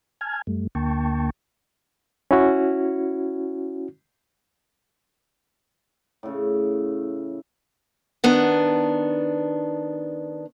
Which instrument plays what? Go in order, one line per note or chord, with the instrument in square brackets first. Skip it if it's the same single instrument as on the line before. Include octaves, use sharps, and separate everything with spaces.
[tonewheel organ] G#5 A5 F6 G#6
F#2 G3 A3
D2 D3 A#3 G5 A5 C#6
[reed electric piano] C#4 E4 F#4
[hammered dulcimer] A2 C#3
[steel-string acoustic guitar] D#3 B3 D4